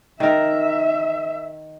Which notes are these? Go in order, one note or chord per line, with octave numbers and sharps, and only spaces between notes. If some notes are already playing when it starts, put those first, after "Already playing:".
D#3 A#4 E5